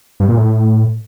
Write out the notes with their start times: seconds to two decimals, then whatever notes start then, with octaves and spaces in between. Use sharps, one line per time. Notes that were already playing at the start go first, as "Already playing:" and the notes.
0.20 G2
0.29 A#2
0.37 A2